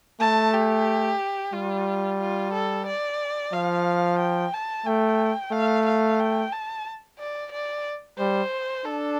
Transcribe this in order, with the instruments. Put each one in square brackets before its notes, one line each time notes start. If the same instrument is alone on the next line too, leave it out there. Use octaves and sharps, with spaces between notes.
[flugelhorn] A3 [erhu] A5
[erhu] G4
[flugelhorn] G3 [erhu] F4
[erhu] F4
A4
D5
[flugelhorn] F3 [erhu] F5
[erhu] G5
A5
[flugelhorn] A3 [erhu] G5
[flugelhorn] A3 [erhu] F5
[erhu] F5
G5
A5
D5
D5
[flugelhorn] G3 [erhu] C5
[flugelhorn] D4 [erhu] A4